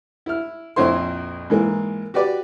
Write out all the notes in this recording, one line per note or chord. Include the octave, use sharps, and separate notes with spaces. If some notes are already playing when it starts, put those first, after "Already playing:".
E4 F6
A#1 F2 E4 C5 C#5 C6
G#2 E3 A#3
F#4 G4 B4 D5